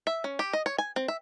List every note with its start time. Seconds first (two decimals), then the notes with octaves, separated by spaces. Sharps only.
0.07 E5
0.24 C#4
0.39 G4
0.53 D#5
0.66 C#5
0.78 G#5
0.96 C4
1.08 E5